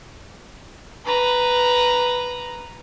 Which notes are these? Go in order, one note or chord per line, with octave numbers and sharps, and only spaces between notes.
B4 A#5